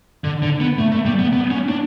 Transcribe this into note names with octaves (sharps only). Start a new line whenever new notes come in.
D3
D3
B3
A3
A3
G3
B3
B3
C#4
D4